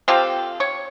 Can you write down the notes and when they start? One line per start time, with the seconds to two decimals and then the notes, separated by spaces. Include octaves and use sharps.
0.08 C4 F4 G4 A4
0.60 C#5